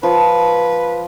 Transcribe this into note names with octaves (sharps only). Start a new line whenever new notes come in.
F3 B4